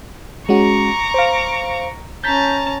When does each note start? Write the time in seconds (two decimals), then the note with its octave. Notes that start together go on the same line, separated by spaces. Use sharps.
0.49 G#3 C#4 F#4 A#5 C#6 D6
1.14 C5 F5
2.24 C#4 A5 A#5 G6 A6 B6